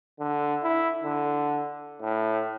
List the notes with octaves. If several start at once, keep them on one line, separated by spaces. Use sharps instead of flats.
D3
E4
D3
A2